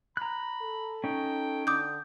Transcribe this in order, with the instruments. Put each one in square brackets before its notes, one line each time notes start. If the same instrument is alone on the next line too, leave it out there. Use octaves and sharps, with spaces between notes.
[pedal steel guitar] A#5 F#6 [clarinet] B5
[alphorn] A4
[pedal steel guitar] C#4 D#4 [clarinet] G5
[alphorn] D3 [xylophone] D6 D#6 G6